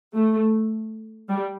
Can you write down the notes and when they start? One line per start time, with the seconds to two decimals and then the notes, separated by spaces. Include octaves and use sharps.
0.15 A3
1.29 G3